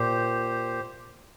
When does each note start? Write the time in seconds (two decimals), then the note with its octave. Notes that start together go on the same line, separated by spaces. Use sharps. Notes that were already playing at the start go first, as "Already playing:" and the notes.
Already playing: A#2 G4 C5